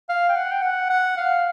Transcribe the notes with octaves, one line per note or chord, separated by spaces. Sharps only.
F5
G5
F#5
G5
F#5
F#5
F5